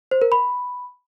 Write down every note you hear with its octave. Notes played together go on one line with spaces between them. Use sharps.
C5
A#4
B5